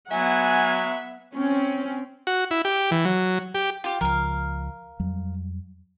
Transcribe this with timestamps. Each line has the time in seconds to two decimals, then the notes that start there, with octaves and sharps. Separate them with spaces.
0.11 F#3 B3 E5 F#5 G#5
1.36 C4 C#4
2.27 F#4
2.51 E4
2.65 G4
2.91 E3
3.05 F#3
3.55 G4
3.84 F4 G4
4.01 C#2 F3 A#4 F5
5.00 F2 F#3 G3